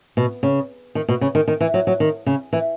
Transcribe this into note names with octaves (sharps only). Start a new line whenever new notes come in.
B2
C#3
D#3
B2
C#3
D#3
D#3
E3
F#3
F#3
D#3
C#3
E3